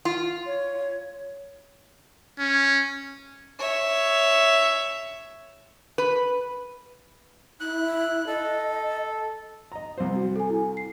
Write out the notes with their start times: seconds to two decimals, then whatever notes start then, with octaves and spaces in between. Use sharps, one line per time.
0.05 F4
0.46 C#5
2.39 C#4
3.59 C#5 E5
5.98 B4
7.60 E4 F#6
8.27 A4 D#5
9.72 D#5 A#5
9.98 C2 C5
10.16 F#4
10.36 A4 G#5
10.50 E4
10.77 C7